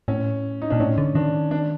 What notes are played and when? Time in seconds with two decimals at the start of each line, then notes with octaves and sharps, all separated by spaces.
0.08 A2 C#4
0.62 D#4
0.70 A#2 D4
0.80 A2 C#4
0.98 D3
1.15 D#3 D4
1.51 D4